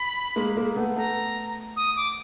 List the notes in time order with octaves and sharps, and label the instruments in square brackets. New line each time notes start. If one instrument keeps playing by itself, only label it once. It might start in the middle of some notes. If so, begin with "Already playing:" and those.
Already playing: [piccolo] B5
[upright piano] G#3 A#3
G#3 A#3
A3 B3
[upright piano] A3 B3 [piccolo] A#5
[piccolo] D#6
D6